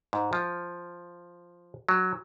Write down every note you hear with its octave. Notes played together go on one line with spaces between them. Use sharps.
G#2
F3
F#3